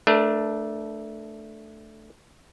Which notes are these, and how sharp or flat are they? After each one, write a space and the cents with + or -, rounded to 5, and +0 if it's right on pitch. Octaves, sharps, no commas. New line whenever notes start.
A3 +0 D4 +0 A#4 +40